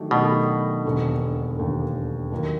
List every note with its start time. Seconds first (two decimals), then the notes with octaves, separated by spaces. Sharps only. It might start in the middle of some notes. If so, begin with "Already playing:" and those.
Already playing: D#3 F#3 A3 D4 G4
0.11 B2 D#3 F#3 A3 D4 G4
0.85 E1 D#2 D3
1.58 E1 D#2 D3
2.32 D#2 D#3 F#3 A#3